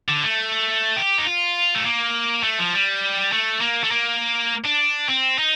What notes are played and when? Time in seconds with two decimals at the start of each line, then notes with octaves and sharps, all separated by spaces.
0.08 D3
0.23 A3
0.97 G4
1.18 D#4
1.26 F4
1.75 A3
1.86 A#3
2.43 A3
2.59 F3
2.74 G3
3.33 A3
3.61 A#3
3.84 A3
3.91 A#3
4.65 D4
5.09 C4
5.38 D#4